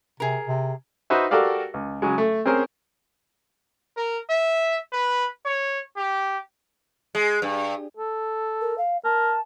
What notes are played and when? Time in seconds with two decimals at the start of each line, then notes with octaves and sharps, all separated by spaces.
0.20 C3 G#4 A#4
0.47 C3
1.10 D#4 F#4 B4 C5 E5
1.31 F#4 G4 A4 A#4 D5 F5
1.74 C#2
2.02 C#3 F#3 G#3
2.18 A3
2.46 C4 C#4 G#4 A#4 C5
3.97 A#4
4.29 E5
4.92 B4
5.45 C#5
5.97 G4
7.15 G#3
7.42 G2
7.97 A4
8.61 A#4
8.78 F5
9.04 A#4 A5